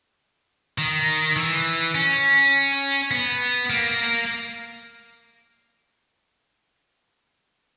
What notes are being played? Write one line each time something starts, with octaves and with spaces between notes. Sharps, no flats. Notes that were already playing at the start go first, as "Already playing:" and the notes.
D#3
E3
C#4
B3
A#3